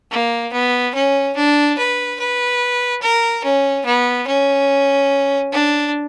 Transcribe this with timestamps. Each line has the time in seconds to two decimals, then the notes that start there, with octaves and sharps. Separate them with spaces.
0.11 A#3
0.53 B3
0.95 C#4
1.36 D4
1.78 B4
2.19 B4
3.02 A#4
3.44 C#4
3.85 B3
4.27 C#4
5.52 D4